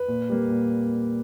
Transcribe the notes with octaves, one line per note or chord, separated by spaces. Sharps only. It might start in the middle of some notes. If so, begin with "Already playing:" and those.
Already playing: B4
A#2
G3 A#3
A#2